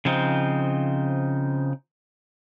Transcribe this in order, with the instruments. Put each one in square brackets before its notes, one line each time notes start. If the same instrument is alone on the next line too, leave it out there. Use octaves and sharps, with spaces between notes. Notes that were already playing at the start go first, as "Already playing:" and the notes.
[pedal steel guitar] C#3 F3 C4 D#4